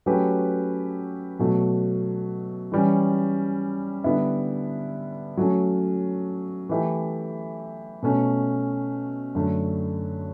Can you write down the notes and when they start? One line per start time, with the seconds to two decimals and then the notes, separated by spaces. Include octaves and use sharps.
0.06 F#3 A3 C#4 G4 B4
1.39 B2 F#3 A3
2.72 E3 G3 C#4
4.04 D3 G3 B3 E4
5.37 F#3 A3 C#4
6.69 E3 A3 E4 G4
8.02 B2 A3 C#4
9.35 F#2 D3 A3